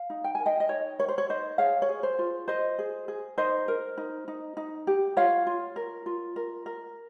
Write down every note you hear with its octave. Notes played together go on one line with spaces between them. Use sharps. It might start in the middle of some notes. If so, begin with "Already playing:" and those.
Already playing: F5
D#4
G5
A#4 G#5
D#5 G5
D#5
D#4 C#5
A#4 C#5
C5
C#5
D#4 C5 D#5
G#4 C#5 F5
C#5
G#4
C5
F4
F4 C5 D#5
G#4
G#4
D#4 C5 D#5
A#4
D#4
D#4
D#4
G4
F4 C#5 F5
F4
A#4
F4
A#4
A#4